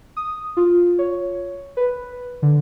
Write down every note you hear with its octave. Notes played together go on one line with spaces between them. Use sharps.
D#6
F4
C#5
B4
D3